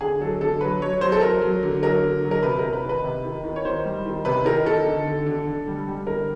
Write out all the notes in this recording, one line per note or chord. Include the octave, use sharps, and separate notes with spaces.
D3 G#4
F#3 A4
D3 A4
F#3 B4
F#3 C#5
F#3 C5
A4
F#3 A#4
F#3
D3
F#3 A#4
D3
F#3
A#4
C3 B4
C3 A#4
B4
D#3
B4
C3
D#3
D#3
C#5
D#3 C5
G3
D#3
C3 B4
D#3 A#4
D#3 A4
D3
D3
D3
D3
G3
G3
D3 A#4